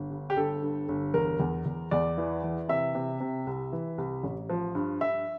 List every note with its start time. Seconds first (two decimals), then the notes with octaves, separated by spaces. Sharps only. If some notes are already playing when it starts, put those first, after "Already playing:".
Already playing: G1
0.11 G2
0.30 G4
0.37 G1 A4
0.63 G2
0.89 G1
1.14 E2 A#4
1.40 E2
1.66 E2
1.91 E2 D5
2.18 E3
2.43 E3
2.69 C3 E5
2.95 C3
3.20 C3
3.47 C2
3.72 E3
3.98 C2
4.24 A1
4.49 F3
4.75 G2
5.01 G2 E5